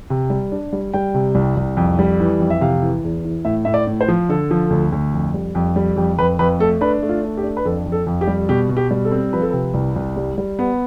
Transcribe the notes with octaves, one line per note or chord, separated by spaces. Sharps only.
C3
G3
D4
G3
G3 G5
C3
C2
C2
F2
G3
E3
F2
E5
C3 F5
E3
E2
E3
A2 E5
A2 E5
D5
A2
C5
F3
D3 A4
F3
D2
D2
F2
G3
F2
G3
F2 G4
F2 B4
F2 B4
A3 A4
D4 B4
A3
F4
D4
G4
D4
B4
F2 A4
F2
A4
F2
G4
G3
B2 G4
B2
G4
G3
A4
C4
F3 B4
A4
C3 B4
C2
C2
G3
G3
B3